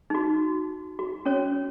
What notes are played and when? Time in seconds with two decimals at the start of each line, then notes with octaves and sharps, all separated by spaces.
0.10 D#4 F#4
0.99 F#4
1.25 C#4 C#5